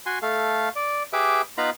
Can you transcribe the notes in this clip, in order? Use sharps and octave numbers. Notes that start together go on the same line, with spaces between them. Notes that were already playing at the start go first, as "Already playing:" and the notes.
F#4 G#5 C6
A3 A4 F5
D5
G4 G#4 B4 E5 D6
B3 D#4 F4 F5 A#5 B5